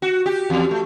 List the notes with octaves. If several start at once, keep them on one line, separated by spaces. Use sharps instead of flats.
F#4
G4
E2
A3